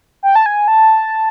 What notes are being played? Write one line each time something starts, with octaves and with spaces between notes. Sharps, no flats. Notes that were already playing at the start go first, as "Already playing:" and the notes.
G5
A5
G#5
A5